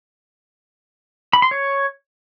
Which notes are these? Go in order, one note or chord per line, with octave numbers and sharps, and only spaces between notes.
B5
C6
C#5